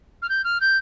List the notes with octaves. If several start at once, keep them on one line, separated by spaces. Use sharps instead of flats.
F6
G6
F6
G6